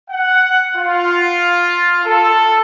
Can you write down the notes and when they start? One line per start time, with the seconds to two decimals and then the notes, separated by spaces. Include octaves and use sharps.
0.10 F#5
0.76 F4
2.05 A4